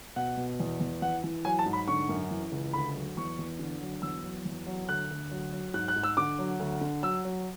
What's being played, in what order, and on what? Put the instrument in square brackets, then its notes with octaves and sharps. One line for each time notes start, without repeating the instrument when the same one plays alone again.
[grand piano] B2 F#5
B2
E2
E2
E3 F#5
E3
F#3 G#5
A5
G#2
B5
D3 C#6
F#2
E3
C#2
D2 B5
F#3
E2 C#6
E2
D3
F#3
E2 E6
F#3
E2
F#3
D2 F#6
D2
F#3
F#3
G#2 F#6
F#6
G#2
E6
D3 D6
F#3
D2
D3
F#3 E6
F#3